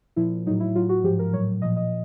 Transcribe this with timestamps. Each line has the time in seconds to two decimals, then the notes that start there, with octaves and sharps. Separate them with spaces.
0.16 A#2 F3 E4
0.46 F#3 D#4
0.49 A2
0.60 E4
0.75 A2 F#3 F4
0.89 F#4
1.04 G#2 F3 G4
1.19 A#4
1.33 A2 F#3 C#5
1.62 A#2 F3 D#5
1.77 D#5